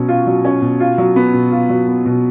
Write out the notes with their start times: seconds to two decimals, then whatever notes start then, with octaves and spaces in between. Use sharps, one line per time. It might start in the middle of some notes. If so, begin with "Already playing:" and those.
Already playing: B2 F#3 C#4
0.08 F4
0.27 F#3
0.45 C#4
0.62 B2
0.80 F4
0.98 F#3
1.16 B3
1.34 B2
1.52 F4
1.69 F#3
1.87 B3
2.06 B2